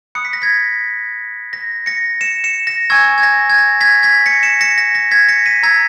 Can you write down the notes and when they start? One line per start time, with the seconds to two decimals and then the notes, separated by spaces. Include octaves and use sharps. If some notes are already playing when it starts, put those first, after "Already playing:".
0.15 B5 D#6 F#6 C#7
0.25 B6
0.33 A#6
0.42 G#6 B6
1.53 A#6
1.86 A#6 C#7
2.21 C#7 E7
2.44 C#7 E7
2.67 A#6
2.90 G#5 C#6 E6 G#6
3.18 G#6
3.23 A#6
3.50 G#6
3.58 A#6
3.81 G#6 B6
4.03 G#6 B6
4.26 A#6 C#7
4.43 C#7 E7
4.61 A#6 C#7
4.78 A#6
4.95 A#6
5.11 G#6 B6
5.29 A#6 C#7
5.46 B6 D#7
5.63 A#5 E6 G#6 B6